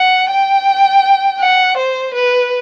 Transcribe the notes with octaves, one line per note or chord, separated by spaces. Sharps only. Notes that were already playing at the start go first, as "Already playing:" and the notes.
Already playing: F#5
G5
F#5
C5
B4